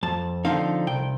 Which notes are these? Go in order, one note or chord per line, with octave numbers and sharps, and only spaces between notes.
F2 A5
D3 F3 C4 D#4 F5
C2 G5